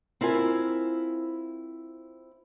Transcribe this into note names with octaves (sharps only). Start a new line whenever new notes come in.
C4 E4 F4 A#4 G#5